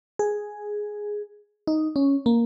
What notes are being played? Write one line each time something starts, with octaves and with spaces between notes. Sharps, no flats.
G#4
D#4
C#4
A#3